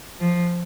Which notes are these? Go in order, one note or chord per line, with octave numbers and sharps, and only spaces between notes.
F3